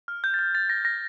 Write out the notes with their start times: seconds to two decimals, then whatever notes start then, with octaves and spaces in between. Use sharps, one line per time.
0.08 F6
0.24 G6
0.34 A6
0.39 G6
0.55 A6
0.69 A#6
0.85 A#6